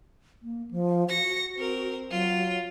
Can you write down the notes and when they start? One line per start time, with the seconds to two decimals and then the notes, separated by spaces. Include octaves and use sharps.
0.42 A#3
0.71 F3
1.09 F#4 A#6 C#7
1.57 C4 A#4
2.11 F#3 F4